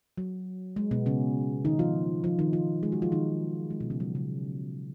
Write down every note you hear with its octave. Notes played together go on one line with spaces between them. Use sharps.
F#3
G#3
B2 B3
C#3 C#4
D#3 D#4
F3 F4
F3 F4
D#3 D#4
F3 F4
G#3 G#4
F#3 F#4
F3 F4
D#3 D#4
G#3
B2 B3
C#3 C#4
F#3
C#3